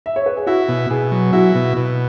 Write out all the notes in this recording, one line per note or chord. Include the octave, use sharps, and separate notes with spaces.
E5
C#5
B4
G#4
E4 F#4
B2
B2 G#4
F#3
E4 F#4
B2
B2